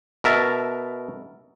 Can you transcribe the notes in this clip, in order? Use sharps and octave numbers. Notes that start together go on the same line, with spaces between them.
B2 A#4 E5 A5